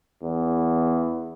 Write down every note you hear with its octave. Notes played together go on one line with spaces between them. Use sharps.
E2